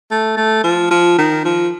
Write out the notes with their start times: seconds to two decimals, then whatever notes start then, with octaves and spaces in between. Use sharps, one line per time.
0.11 A3
0.37 A3
0.63 F3
0.91 F3
1.18 D#3
1.45 F3